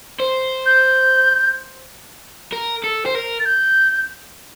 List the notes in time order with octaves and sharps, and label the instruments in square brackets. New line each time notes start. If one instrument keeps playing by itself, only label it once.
[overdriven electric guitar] C5
[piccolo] G6
[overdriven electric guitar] A#4
A4
C5
A#4
[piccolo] A6
G6